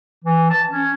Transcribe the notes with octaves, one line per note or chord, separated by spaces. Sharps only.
E3
A5
C#4